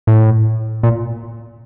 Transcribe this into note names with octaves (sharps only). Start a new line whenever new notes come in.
A2
A#2